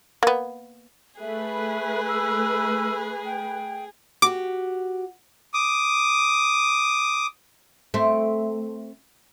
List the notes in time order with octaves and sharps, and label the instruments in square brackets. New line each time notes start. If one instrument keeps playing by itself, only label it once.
[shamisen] A#3 B3
[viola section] A3 B4 [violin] G#4 [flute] E5
[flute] E6
G5
[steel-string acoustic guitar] F#4 G4 [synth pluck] D6
[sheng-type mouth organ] D6 D#6
[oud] A3 C4